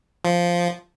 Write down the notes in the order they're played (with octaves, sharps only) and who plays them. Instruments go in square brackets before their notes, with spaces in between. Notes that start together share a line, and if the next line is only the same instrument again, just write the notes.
[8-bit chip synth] F3